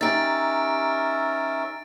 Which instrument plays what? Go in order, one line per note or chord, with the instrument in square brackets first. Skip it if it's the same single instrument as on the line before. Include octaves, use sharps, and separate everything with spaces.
[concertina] C#4 A#4 E5 [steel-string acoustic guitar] D#4 G4 [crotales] A6 D7